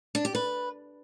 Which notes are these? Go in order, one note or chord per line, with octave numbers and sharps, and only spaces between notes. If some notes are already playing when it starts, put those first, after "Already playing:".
D4
G4
B4